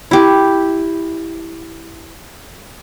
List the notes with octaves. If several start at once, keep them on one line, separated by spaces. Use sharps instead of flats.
E4 G4